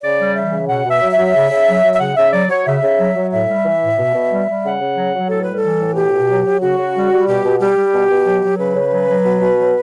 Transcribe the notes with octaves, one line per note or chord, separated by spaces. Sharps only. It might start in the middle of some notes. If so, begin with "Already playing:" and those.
C#3 D5
G3
E3 E5
C#3
B2 F#5
B2
E5
F#3
E5
F#3
C#3
C#3
F#3
F#3
E5
C#3 F#5
C#3 E5
F#3 D5
F#3 C#5
C#3 E5
C#3
F#3
F#3
A2 E5
G3
E3
A2
B2
B2
G3
G3
C#3 F#5
C#3
F#3
F#3
A2 A4
G3 B4
A4
E3
A2
B2 G4
B2
F#3
F#3
C#3 F#4
C#3
G3
G3
B2 G4
B2
G3 G4
G3
B2
B2
F#3
F#3
C#3 B4
C#3
F#3
F#3
B2
B2
F#3